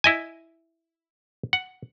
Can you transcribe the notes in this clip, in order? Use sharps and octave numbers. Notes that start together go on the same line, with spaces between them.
E4 D#5 G#5
F#5